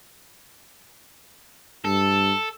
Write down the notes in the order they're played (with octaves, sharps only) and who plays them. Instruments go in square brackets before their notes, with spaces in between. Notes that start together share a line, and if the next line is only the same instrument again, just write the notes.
[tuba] G2 [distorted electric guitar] A4